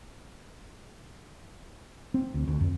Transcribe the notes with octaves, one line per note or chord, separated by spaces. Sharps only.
C4
D2
D2
F2